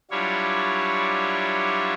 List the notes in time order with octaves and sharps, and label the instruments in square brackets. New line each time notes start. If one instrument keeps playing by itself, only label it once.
[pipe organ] F#3 G3 D4 E4 F4 C#5